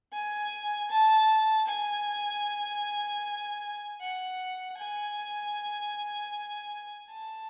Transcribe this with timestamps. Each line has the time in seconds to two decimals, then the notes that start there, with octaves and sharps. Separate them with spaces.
0.13 G#5
0.90 A5
1.68 G#5
4.01 F#5
4.78 G#5
7.12 A5